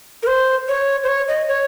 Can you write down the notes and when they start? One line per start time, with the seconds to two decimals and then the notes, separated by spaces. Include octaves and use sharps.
0.23 A#4
0.27 C5
0.68 C#5
1.03 C5
1.08 C#5
1.28 D#5
1.48 C#5